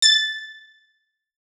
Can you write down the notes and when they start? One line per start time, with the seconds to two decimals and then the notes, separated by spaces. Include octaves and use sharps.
0.02 A6